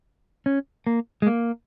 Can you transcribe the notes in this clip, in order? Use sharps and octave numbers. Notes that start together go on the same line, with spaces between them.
C#4
A#3
G#3
A#3